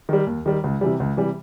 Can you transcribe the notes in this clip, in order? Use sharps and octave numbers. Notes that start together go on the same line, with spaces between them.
D#3 G3
D#2
D#3 G3
C#2
C3 E3 G3
C#2
C3 E3 G3